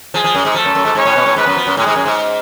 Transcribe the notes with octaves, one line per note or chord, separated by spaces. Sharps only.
F3 G#3 G#4
F3
F#2
G#2
F3 A3 A4
F#2
F#2
G#2
G#2 C#4 C#5
A2
B2
A2
G#2 B3 B4
F#2
F3
F#2
A2 G#3 G#4
G#2
F#2
G#2